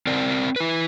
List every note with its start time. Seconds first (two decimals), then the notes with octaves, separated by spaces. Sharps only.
0.07 C4 A#4 D5
0.56 E4 B4